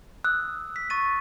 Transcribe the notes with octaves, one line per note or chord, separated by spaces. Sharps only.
D#6 E6 F#6
B6
C#6 A6 D#7